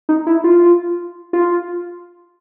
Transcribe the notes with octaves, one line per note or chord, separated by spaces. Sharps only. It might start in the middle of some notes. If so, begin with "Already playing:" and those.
D#4
E4
F4
F4